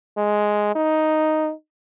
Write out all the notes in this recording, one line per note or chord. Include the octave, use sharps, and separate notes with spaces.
G#3
D#4